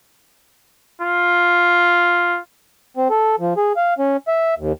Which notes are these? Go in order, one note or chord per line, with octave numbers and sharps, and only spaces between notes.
F4
C4
A4
F3
G#4
F5
C#4
E5
D#2